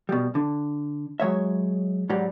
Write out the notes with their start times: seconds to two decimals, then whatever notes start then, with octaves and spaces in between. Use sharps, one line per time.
0.09 B2 G3
0.35 D3
1.20 F#3 G#3 C#5 E5
2.09 G#2 F#3 G3